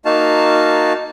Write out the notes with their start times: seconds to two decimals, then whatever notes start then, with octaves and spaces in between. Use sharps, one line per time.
0.05 A#3 D#4 F#4 F5 A5